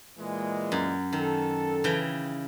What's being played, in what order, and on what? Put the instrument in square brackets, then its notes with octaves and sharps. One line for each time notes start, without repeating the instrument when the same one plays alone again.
[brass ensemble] A#2 E3 G#3
[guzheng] F#2
[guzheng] D#3 [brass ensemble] A4
[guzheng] C#3 E3 G5